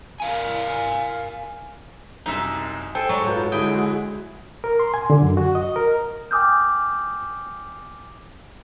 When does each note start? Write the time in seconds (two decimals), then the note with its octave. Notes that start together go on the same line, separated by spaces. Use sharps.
0.20 A#4 F5 G#5
2.26 C2 F#2 D#4 E5
2.95 A4 C5 G5 G#5
3.09 G#2 F#3 D5 A#5 C#6
3.27 G#2 F4 F#4 B4 G6
3.52 D3 G#3 E4 F#4 G#4 G5 D#6
4.64 A#4
4.79 C6
4.94 G#5
5.10 D3
5.22 F#2
5.37 F#4
5.55 D#5
5.76 A#4
6.31 G5 G#5 D6 D#6 F6 G6